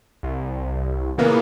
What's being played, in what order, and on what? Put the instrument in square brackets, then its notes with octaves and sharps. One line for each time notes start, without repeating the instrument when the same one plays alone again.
[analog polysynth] C2
A#2 C#3 E3 A#3 B3